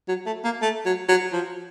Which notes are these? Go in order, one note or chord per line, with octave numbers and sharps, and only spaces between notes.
F#3
A3
A#3
A3
F#3
F#3
F3